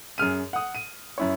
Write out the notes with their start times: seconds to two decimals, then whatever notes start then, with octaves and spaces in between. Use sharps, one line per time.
0.18 F#2 G#4 F6 D#7
0.53 F#5 D#6
0.75 D#7
1.18 F#2 E4 C#5